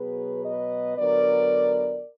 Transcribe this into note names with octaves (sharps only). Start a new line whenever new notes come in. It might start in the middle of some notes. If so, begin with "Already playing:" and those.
Already playing: B2 F#3 B3 G#4 B4
B4 D#5
D3 F#3 B3 A#4 D5